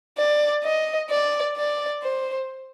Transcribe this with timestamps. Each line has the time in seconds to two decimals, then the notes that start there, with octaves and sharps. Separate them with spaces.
0.18 D5
0.64 D#5
1.10 D5
1.56 D5
2.02 C5